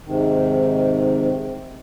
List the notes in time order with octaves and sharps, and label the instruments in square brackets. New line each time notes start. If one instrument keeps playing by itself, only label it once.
[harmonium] G#2 C3 D#3